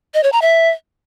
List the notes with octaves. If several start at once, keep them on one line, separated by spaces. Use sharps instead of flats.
D#5
C#5
A#5
E5